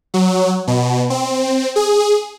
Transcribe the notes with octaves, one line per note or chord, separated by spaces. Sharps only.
F#3
B2
C4
G#4